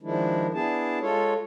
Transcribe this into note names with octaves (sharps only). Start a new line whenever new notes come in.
D#3 F3 G#3 D4 E4
B3 D4 E4 G#4 A5
G#3 F4 A4 C#5